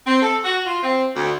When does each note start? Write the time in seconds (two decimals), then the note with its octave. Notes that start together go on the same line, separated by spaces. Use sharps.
0.06 C4
0.22 A4
0.44 F#4
0.65 F4
0.83 C4
1.16 D2